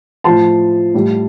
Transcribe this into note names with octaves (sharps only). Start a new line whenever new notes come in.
A2 F3 A5 C6
A2 G3